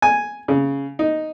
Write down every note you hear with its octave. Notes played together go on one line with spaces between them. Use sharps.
G#5
C#3
D#4